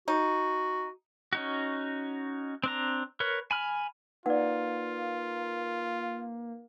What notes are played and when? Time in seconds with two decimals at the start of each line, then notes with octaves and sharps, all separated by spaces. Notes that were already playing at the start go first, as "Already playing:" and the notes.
0.08 D#4 F#4
1.33 C#4 D#4 F#4
2.64 C4 D4 A#5
3.20 A#4 B4 C#5
3.51 G#5 B5 F6
4.26 A#3 D#4 F4 B4 D5 F#5